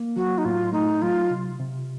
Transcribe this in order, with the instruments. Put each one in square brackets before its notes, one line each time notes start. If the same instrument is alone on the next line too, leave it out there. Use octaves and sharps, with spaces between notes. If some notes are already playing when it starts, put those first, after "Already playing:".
Already playing: [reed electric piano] A#3
[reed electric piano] F#3 [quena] F#4
[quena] D#4
[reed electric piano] A2 [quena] F4
[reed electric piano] A3 [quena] D#4
[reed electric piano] F#3 [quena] F4
[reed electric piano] C3
C3